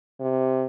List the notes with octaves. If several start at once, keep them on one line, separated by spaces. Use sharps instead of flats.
C3